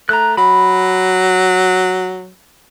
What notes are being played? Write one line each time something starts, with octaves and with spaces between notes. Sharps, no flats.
A3 A#5 F#6
F#3 B5